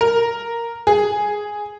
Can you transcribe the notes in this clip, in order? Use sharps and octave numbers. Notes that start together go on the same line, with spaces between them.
A#4
G#4